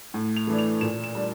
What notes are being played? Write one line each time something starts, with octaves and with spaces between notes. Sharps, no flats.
A2
F7
E3 A3 D4
F7
A#2 E7
E7
G3 D4